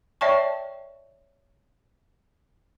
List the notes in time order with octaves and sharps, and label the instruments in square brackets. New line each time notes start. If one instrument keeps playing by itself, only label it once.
[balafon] C#5 D5 E5 G5 A5 C#6